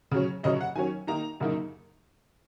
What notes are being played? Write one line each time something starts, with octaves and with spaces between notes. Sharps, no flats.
C#3 F#3 C#4
F#2 C#3 F#3 C#4 D#5
F#5
D#3 F#3 C#4 G#5
D#3 A#3 D#4 A#5
F#2 C#3 A#3 D#4